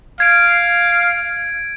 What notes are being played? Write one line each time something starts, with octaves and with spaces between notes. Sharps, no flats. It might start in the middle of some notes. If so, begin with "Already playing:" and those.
F5 G#6 D7